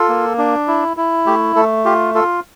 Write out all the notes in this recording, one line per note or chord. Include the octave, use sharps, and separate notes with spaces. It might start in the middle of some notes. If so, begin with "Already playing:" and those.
Already playing: F4 A4
A#3
D4
E4
E4
A3 G4
A3 A4
F4 G4
F4 A4